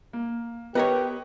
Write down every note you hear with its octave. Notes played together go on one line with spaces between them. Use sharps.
A#3
B3 G4 A#4 B4 C#5 D#5